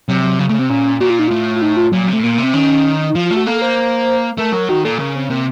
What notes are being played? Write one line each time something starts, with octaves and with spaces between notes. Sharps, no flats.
C3 F#3
F#3
C#3 F#3
C#3 A3
C3 C4
A#2 C#4
A#2 F#4
F4
D#4
A2 F4
F4
D#4
F4
A#2 F#3
F#3
C3
A3
A2
A#2 A#3
A#3
C3
C4
D#3 C#4
D#4
F3 F4
F4
A3
F#4
A#3 A4
C5
A3 A#4
F#3 A#4
D#3 F#4
A#2 A4
C#3 A#4
C4
C3 A#3